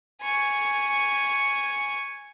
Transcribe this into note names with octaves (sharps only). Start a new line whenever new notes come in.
G#5 C#6